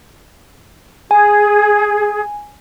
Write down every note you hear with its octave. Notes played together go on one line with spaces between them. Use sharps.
G#4 G#5